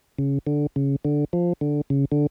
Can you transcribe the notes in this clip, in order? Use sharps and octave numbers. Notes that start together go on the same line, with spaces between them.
C#3
D3
C#3
D3
F3
D3
C#3
D3